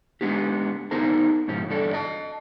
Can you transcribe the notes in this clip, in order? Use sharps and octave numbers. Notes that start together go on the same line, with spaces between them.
G#3 B3 D4 G4
B3 D#4 G#4 A#4 C5 A5
G#2 B2 F3 C#4
E2 G2 D4 A4 C#5
D#5 A5